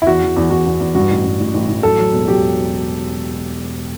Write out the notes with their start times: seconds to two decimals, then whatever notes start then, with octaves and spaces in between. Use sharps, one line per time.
0.02 E4
0.07 E2 F#4
0.22 E2
0.37 E2
0.51 E2 F#4
0.66 E2
0.80 E2
0.95 G2 F#4
1.10 A1
1.25 G2
1.40 A1
1.54 A1
1.69 A1
1.83 F#3 A4
1.99 F#3
2.13 E1
2.28 F#3 G4